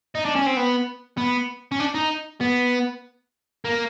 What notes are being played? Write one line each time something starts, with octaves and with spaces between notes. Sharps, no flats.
D#4
D4
C#4
C4
B3
B3
C#4
D4
D#4
B3
A#3